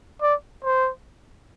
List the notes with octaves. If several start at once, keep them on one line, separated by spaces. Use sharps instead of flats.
D5
C5